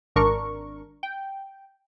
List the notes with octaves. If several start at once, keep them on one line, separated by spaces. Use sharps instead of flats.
G#1 D4 A#4 C#6
G5